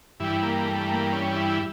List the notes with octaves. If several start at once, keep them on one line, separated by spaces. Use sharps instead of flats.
G2 E3 G3 E4
A#3
A3
A#3
C#4
E4